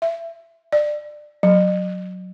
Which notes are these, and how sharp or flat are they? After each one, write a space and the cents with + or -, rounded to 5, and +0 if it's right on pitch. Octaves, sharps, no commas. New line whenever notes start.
E5 +25
D5 +25
F#3 -5